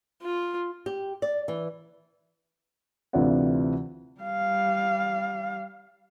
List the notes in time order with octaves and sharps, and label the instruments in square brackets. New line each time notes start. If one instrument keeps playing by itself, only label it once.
[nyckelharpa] F4
[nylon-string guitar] G4
D5
E3
[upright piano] D2 C3 E3 F4 D5 F#5
[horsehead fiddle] G3 F5